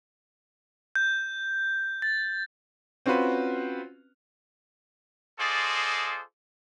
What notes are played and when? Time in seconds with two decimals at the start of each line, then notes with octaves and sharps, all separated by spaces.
0.95 G6
2.02 A6
3.06 C4 C#4 F4 F#4 B4
5.39 F4 G#4 A4 C5 D5 D#5